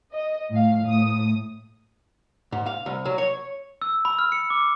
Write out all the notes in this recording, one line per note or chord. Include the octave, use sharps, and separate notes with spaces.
D#5
A2 F5
A2 D#6
G#2
F5
C2
F#3
C#5
E6
B5
F6
C#7
D6